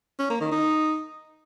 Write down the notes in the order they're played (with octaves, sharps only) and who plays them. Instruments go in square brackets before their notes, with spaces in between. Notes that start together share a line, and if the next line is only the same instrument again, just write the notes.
[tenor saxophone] C#4
A#3
D#3
D#4